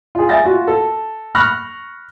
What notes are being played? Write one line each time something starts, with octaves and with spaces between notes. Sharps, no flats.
F4 G#4
E5 G#5 A6 A#6
F4 F#4
A4
B5 C#6 F6 F#6 A#6